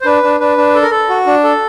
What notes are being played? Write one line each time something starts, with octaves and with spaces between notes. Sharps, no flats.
C5
D4 B4
D4
D4 B4
D4
A4
A#4
A4
F#4
D4
A4